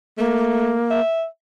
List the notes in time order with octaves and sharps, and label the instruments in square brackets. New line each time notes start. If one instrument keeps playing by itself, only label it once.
[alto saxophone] A3 [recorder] A#3
[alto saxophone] E5